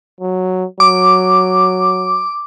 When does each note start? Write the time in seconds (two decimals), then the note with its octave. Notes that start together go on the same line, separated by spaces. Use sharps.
0.21 F#3
0.80 F#3 D6